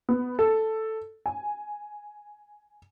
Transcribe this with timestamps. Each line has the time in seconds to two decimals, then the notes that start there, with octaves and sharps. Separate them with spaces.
0.09 B3
0.39 A4
1.26 G#5